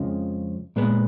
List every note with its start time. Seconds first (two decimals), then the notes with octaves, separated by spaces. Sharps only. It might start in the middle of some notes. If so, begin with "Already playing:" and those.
Already playing: F2 C#3 F3 G#3
0.76 A#2 G#3 B3